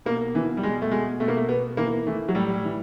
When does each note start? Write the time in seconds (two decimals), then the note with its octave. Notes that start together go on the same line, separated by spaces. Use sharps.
0.06 B2 A#3
0.34 B2 E3
0.57 G3
0.63 B2 G#3
0.82 A3
0.91 B2 G#3
1.20 B2 A3
1.28 A#3
1.37 A3
1.49 B2 B3
1.77 E3 A#3
2.06 E3 A3
2.28 F#3
2.35 A2 G3
2.64 E3